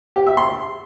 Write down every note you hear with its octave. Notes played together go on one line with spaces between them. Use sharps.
G4
E5
C6